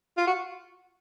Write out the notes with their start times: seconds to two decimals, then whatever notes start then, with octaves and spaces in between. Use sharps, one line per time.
0.18 F4
0.27 F#4